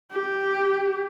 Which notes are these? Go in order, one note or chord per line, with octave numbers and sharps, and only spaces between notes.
G4